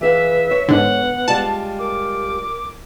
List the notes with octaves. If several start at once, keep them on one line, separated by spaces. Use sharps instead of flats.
E3 G#4 B4 E5 F5
C#5
G#2 D3 B3 F#5
G3 G#3 F4 A5
A#4 D6